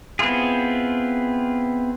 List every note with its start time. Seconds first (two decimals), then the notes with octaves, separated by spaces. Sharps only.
0.19 B3 C4 E4 F4 G#4